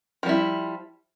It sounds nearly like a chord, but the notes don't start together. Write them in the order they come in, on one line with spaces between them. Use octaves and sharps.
F3 G3 E4